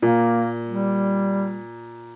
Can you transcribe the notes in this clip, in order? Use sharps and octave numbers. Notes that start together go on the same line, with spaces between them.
A#2 A#3
G3